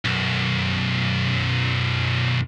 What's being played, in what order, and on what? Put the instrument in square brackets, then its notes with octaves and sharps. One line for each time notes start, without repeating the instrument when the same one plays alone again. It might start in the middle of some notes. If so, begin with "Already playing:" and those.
[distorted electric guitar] B1 F#2